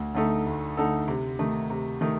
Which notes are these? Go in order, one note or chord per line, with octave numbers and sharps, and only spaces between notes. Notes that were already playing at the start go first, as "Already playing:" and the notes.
Already playing: D2
D3 A3 D#4 A4
D2
D3 A3 D#4 A4
C3
D#3 A3 D#4
C3
D#3 A3 D#4